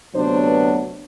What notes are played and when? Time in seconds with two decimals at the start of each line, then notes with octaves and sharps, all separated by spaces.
0.14 D2 C3 F#3 B3 D4 C5
0.48 B4